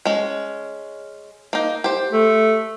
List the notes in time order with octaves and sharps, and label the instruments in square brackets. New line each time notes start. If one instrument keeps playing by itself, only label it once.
[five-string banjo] G#3 C#4
A#3 D#4
G4 C5
[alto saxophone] A3